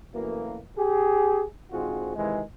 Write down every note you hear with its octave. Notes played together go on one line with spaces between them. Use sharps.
F#2 B2 E3 A3 A#3
G4 G#4
G#2 D3 C4 F4 F#4 G#4
C3 D#3 E3 G#3